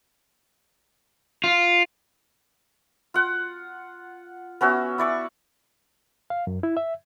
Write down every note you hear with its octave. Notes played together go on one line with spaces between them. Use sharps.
F4
F4 F#5
B3 C#4 F#4 E5
E4 D5 C#6
F5
F#2
E4
E5